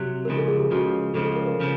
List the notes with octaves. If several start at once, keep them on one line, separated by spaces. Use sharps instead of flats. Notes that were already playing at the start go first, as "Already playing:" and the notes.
Already playing: C3 F#3 G4
C#2 C#3 F3 A#4
A4
G#4
G4
C#2 C#3 F3 F#4
C#2 C#3 F3 A4
A4
A#4
B4
C#3 F3